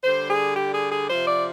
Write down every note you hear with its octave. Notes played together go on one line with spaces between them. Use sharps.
D3 G3 C5
G#4
G4
G#4
G#4
C3 F3 C5
D5